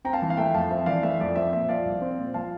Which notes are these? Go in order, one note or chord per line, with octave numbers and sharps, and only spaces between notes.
C4 G5 A#5
F5 A5
E3
F5 A5
A3 E5 G5
F2 F5 A5
C4 E5
E3 D5 F5
A3 E5
F2 D5
C4 E5
A#2 E5
F3 D5 F5
C2
C4
A#2
F3 F5 A5